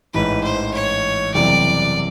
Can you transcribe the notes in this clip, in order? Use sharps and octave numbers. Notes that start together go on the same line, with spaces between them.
A1 G#2 E3 B4
C5
C#5
F#1 E2 C3 E3 G3 D5